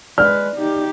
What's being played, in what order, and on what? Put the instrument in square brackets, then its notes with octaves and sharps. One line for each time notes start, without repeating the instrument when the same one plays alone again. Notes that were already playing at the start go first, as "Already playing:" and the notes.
[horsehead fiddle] G#3 B4 [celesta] D5 [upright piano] F6
[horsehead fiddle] D#4 G4